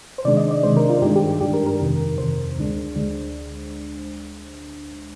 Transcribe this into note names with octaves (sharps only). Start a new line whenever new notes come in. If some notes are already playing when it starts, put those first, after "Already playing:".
C5
C3 D#3 G#3 D4 D5
D#5
D5
C3 D#3 G#3 D4 C5
A#4
F4
G2 D#3 G#3 D4 G4
G4
G4
G2 D#3 G#3 D4 G4
A#4
A#4
F2 C3 D#3
F2 C3 D#3 C5
D2 D3 G#3 D4
D2 D3 G#3 D4